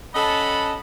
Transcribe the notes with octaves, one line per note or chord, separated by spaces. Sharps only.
C#4 A4 D#5 F#5 A5 B5